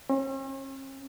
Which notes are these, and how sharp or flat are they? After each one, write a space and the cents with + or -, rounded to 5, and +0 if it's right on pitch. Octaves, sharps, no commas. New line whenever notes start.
C#4 -45